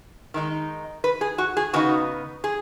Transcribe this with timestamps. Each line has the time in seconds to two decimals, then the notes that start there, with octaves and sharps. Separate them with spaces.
0.34 D#3 G#3 D#4
1.04 B4
1.21 G#4
1.38 F#4
1.57 G#4
1.73 C#3 B3 D#4 F#4
2.44 G#4